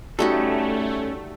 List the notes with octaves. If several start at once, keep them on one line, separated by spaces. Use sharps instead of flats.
G3 A3 C#4 D#4 F#4 A4